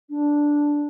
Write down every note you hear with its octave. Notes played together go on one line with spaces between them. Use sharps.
D4